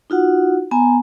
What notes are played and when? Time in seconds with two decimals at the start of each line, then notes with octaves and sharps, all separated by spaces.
0.10 D#4 F4 F#4 F#5
0.71 B3 G#5 A#5